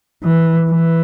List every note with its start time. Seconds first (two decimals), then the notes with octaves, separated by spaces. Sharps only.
0.24 E3
0.71 E3